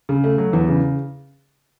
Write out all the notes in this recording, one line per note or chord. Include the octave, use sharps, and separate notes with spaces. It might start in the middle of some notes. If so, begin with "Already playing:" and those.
C#3
A3
F#3
E2
C#3